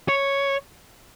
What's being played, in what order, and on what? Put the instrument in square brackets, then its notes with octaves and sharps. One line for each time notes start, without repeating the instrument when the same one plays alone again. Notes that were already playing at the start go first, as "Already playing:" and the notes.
[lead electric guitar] C#5